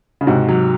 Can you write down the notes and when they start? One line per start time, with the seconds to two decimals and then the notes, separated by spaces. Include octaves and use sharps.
0.21 C#3
0.27 G#2 C3 F#4
0.49 F#3